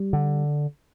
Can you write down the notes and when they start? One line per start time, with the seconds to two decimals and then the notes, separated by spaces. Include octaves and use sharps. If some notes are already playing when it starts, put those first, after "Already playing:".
Already playing: G3
0.13 D3